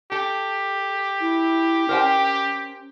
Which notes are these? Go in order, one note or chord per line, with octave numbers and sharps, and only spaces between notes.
G4 A4
E4
C#4 A#4 C5 G5